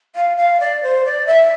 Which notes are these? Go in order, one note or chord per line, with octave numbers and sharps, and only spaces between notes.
F5
F5
D5
C5
D5
E5